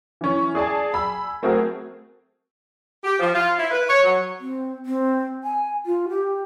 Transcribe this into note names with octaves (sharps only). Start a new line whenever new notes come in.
E3 C#4
G#4 D5 G#5 A5
G#5 B5 E6
A3 C4 F#4 G#4 A#4
G4
F3
F4
E4
B4
C#5
F#3
C4
C4
G#5
F4
G4